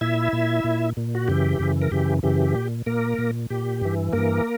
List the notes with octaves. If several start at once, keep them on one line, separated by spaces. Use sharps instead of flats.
A#2 E4 E5
A#2
A#2
A#2
F#4
F#2 C#3 E3 G4
F#2 C#3 E3
A#4
F#2 C#3 E3 G4
F#2 C#3 E3 G4
A#2
A#2 A#3 A#4
A#2
A#2 G4
G2 E3
G2 E3 A#3 A#4